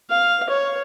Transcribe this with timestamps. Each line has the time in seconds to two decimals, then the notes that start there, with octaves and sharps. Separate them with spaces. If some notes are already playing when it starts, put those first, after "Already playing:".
0.10 F5
0.50 C#5